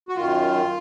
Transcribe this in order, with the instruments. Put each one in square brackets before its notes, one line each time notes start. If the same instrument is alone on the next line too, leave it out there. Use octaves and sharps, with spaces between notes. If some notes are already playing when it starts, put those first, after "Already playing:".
[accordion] F#4
F#2 D#3 F4